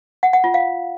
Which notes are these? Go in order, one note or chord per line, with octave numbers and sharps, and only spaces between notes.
F#5
F#5
F4
F5